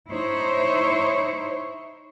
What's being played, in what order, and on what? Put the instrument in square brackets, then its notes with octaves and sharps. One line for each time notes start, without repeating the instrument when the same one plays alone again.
[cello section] D#4 E4 C5 C#5